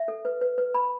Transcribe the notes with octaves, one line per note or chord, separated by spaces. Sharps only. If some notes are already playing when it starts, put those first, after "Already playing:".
Already playing: E5
A4
B4
B4
B4
B5